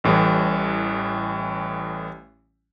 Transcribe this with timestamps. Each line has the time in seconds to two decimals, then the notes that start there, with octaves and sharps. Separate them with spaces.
0.04 A1 A2 E3 G3